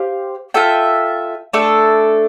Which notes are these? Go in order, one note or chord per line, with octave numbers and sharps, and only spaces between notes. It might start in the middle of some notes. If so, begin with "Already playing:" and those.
Already playing: G4 C5 F5
F4 A4 E5 G5
A3 D4 A4